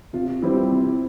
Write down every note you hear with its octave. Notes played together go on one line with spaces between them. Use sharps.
C3 F4
G3 C4 E4 G4
C3